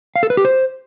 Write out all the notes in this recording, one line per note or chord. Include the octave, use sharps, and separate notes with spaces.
F5
A4
B4
G4
C5